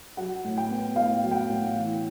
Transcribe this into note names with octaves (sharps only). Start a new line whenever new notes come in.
F#3 F#5
A2
G5
B3
A2 F5
F#3
G5
F#5
A2
E3